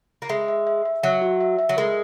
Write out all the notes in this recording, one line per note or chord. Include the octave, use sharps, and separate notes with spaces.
A#3
G#3 E5
E5
E5
E5
F#3 E5
F#4
E5
E5
F#3
G#3 A#4